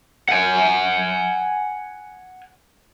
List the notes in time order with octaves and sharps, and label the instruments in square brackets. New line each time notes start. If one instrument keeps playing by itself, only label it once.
[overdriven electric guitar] F#5 G#5